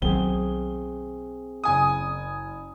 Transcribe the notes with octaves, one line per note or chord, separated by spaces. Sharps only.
B1 D#3 F#3 C4 G#4 G7
F#1 G#5 D#6